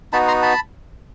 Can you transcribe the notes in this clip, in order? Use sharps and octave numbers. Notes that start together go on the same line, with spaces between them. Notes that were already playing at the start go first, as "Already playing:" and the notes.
B3 D#4 F#4 A5 B5
A#5 C6
A5 B5